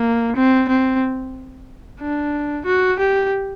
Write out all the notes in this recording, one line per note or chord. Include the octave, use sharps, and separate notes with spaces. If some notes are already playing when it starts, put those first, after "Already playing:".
Already playing: A#3
C4
C4
D4
F#4
G4